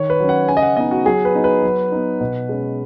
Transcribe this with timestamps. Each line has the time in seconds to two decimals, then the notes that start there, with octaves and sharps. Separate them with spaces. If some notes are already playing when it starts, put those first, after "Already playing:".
Already playing: D#3 C#5
0.10 B4
0.20 F#3 C#4
0.29 F#5
0.48 C#3 G#5
0.57 D#5
0.62 F#5
0.77 B3 D#4 D#5
0.91 F#4
1.05 F#3 G#4
1.25 B4
1.35 B3 D#4
1.44 B4
1.63 F#3
1.92 B3 D#4
2.20 B2
2.49 G#3 C#4